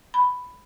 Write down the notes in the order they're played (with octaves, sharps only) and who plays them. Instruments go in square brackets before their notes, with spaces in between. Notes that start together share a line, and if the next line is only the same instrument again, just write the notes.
[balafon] B5